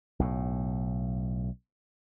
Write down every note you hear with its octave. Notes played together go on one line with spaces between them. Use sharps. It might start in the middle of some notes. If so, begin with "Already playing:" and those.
B1 A2